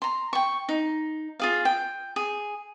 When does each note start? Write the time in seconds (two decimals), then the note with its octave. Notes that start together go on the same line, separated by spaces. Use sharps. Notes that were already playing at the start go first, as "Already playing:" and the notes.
0.02 A#5 C6
0.33 G5 C#6
0.69 D#4
1.40 F4 G#4 F5
1.65 G5
2.16 G#4